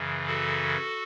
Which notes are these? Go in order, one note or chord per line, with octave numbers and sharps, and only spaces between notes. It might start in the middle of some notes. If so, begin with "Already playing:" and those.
Already playing: F#2 C#3 E3
F#4 A4